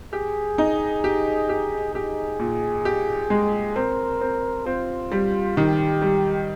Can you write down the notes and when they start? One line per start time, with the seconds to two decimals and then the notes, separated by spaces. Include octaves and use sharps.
0.13 G4 G#4
0.58 D#4
1.04 G4
1.49 G4
1.95 G4 G#4
2.39 A#2
2.85 G4
3.30 G#3
3.76 C4 A#4
4.21 C4
4.66 C4 F4
5.12 G3
5.57 D#3 G4
6.02 G3